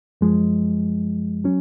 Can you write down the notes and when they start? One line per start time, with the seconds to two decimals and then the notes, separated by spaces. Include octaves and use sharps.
0.21 F#2 F3 G#3
1.44 F#3 C#4